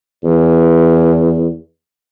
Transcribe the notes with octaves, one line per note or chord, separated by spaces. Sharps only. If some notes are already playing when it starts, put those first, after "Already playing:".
E2